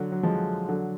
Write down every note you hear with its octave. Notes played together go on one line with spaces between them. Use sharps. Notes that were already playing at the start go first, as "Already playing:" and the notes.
Already playing: D3 F#3
F#3
F3 G#3
D3 F#3